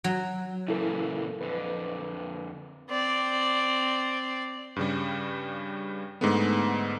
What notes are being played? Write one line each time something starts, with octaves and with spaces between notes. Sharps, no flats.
F#3
A#2 C#3 E3 E4 A4 A#4
F2 D3 B4
C4 D5
G2 C#3 G3
G#2 D3 G#3 A3 B3